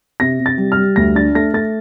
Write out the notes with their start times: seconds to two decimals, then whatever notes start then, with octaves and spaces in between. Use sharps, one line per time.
0.20 C3 A#6
0.40 C3
0.46 A6
0.58 G3
0.72 F6
0.77 G3
0.96 D2 A#6
1.15 D4 A6
1.35 A3 A#6
1.54 A3 A6